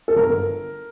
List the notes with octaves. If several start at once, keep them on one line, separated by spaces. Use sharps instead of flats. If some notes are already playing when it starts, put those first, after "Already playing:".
A4
G1 A#4